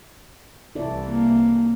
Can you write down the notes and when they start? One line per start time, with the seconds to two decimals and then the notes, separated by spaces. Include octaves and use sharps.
0.75 C2 E3 E4 A4 D5
1.07 A#3